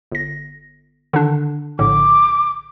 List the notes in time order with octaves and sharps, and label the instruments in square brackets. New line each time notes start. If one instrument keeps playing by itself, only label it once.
[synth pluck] G1 A#6
D3 D#3 D4
[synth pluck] A#1 A2 D3 [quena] D6